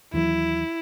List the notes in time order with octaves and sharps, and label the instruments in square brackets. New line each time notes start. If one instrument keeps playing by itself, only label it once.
[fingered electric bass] D#2 E3 F#3 [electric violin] E4